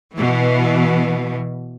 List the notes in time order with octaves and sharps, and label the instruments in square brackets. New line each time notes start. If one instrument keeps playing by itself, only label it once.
[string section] B2 E3